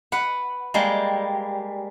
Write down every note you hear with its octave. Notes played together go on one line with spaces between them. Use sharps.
B4 F#5
G3 G#3 A#3